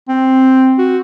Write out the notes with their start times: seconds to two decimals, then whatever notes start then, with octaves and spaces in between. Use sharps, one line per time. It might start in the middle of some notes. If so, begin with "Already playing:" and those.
0.08 C4
0.78 F#4